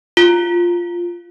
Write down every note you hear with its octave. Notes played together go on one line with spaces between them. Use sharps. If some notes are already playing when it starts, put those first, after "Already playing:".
F4